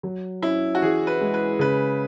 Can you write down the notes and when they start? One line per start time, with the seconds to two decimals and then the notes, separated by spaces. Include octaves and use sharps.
0.03 F#3
0.42 C#4 E4
0.75 F#4
0.82 E3 G#4
1.07 B4
1.21 G#3
1.34 B4
1.59 C#3 B4